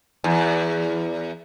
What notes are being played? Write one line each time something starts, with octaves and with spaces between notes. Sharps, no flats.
E2